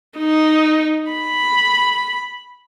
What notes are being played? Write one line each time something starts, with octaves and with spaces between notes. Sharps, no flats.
D#4
B5